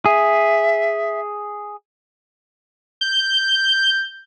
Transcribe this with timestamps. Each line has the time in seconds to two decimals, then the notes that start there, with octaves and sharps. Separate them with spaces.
0.06 G#4 E5
3.01 G6